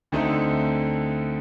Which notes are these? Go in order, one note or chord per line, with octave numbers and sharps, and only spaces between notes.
D2 D3 A3 C4 D#4